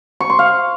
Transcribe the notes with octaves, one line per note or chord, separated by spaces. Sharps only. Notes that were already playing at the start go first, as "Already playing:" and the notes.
C#6
C6
F5